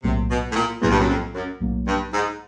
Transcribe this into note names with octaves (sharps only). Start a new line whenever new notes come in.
B1 A2 C3 F#3 A#3
B2
A2
A#2
B1 E2 A2 F#3 A#3
G2
F#2
F2
F#2
B1 A2 F#3 A#3
G2
G#2